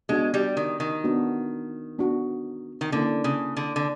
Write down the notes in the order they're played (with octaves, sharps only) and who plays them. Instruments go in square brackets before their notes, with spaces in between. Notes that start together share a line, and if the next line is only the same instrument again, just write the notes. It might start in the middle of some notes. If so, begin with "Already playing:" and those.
[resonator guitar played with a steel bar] G#3 [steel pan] B3 D4 F#4
[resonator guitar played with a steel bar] G3
D#3
D#3
[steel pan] B3 D4 F#4
B3 D4 F#4
[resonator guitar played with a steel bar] D#3
[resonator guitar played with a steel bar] D3 [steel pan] A#3 C#4 E4 A4
[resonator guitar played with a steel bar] C#3
D3
D3